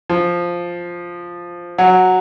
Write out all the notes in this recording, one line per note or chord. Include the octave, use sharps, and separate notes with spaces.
F3
F#3